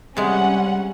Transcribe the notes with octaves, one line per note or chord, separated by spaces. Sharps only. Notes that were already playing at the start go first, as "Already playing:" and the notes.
C3 G3 G#3 C#4 F#5